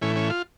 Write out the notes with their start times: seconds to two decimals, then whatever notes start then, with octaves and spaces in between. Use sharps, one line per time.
0.02 A2 E3 C#4
0.16 C#4
0.30 F4